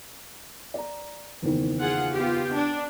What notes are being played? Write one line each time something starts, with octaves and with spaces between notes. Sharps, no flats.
D5 A#5
F#1 E2 D#3
F4 G#4 F#5
B3 F4 G4
D4